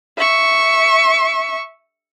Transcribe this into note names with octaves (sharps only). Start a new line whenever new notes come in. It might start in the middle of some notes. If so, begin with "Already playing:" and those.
E5 C#6